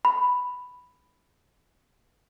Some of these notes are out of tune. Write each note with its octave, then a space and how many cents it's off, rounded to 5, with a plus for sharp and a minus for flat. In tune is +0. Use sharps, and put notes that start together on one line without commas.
B5 +5